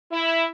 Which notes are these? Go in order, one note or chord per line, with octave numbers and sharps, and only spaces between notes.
E4